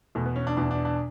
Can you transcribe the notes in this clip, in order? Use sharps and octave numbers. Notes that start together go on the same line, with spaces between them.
E2 B2 A3
B3
C#4
D4
E2 B2 D4
D4
D4